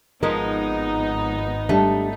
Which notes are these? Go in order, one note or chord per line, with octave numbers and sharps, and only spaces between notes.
G#1 F3 G#3 B3 D#4 A#4
G3 A3 D4